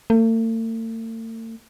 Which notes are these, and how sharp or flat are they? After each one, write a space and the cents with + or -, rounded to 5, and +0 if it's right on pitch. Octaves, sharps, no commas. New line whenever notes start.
A3 +45